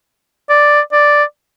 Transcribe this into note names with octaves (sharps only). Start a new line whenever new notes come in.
D5
D5